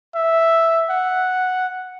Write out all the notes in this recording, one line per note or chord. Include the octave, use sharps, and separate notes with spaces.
E5
F#5